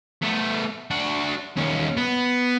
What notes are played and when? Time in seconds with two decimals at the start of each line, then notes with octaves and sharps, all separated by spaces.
0.22 A3 B3
0.91 D4 F#4
1.57 D#2 C#4
1.97 B3